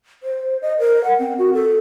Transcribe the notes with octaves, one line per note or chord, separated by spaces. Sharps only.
C5
D#5
A#4
F#5
C4
F#4
A4